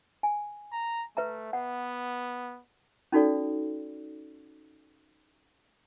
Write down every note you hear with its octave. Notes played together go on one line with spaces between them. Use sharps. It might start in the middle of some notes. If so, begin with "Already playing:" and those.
G#5
A#5
A3 B4 E5 A#5
B3 F#5
C#4 D#4 F#4 A4 D5